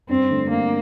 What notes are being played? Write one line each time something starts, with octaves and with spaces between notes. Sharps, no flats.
G2 C4
D3 A3 D4
G2 A#3